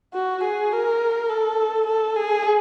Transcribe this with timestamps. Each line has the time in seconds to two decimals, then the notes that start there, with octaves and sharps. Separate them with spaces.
0.14 F#4
0.44 G#4
0.73 A#4
1.30 A4
1.87 A4
2.16 G#4